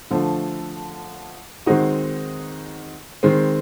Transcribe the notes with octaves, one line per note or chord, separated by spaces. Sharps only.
D3 F3 A3
D#3 G#3 C4 D#4 F#4
D#3 G#3 C4